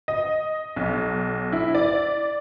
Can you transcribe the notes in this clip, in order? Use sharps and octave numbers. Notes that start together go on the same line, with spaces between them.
D#5
B1
E4
D5